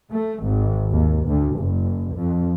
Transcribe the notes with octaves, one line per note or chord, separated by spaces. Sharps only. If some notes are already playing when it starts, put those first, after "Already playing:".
A3
G#1
D#2
D2
F#1
F2